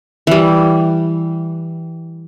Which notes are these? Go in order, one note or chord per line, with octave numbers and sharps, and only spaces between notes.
E3 G3